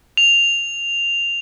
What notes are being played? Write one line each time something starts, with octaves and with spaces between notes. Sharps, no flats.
F7